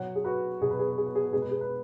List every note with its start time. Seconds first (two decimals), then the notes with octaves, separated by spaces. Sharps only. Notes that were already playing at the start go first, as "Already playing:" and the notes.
Already playing: B2 F#3 C#5 F#5
0.15 G#4
0.24 F#4 B4
0.61 B2 F#3 G#4
0.71 B4
0.79 G#4
0.88 B4
0.98 G#4
1.06 B4
1.15 G#4
1.25 B4
1.33 B2 G#3 G#4
1.42 B4
1.51 G#4
1.61 B4